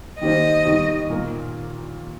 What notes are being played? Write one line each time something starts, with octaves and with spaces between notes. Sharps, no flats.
D#3 A#3 G4 C5 D#5
D#2 D#3 G3
A#2 A#3 A#4